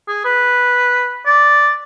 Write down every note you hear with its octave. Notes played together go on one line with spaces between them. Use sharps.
G#4
B4
D5